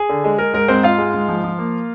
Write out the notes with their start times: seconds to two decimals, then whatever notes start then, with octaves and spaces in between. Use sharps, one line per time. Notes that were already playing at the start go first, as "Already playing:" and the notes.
Already playing: G#4
0.09 D3
0.24 G#3
0.38 G#3 A#4
0.53 G#2 A#4
0.68 G#2 C4 C5
0.83 G#2 F4 F5
0.98 G#3
1.14 G#2
1.28 F3
1.44 F3
1.59 A#3